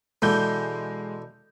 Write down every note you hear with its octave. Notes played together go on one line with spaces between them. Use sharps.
B2 D3 E3 G#3 G6